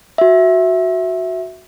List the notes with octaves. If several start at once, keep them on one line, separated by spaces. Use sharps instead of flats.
F#4 E5